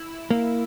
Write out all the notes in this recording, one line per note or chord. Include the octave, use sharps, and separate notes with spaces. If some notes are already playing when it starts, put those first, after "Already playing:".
Already playing: E4
A#3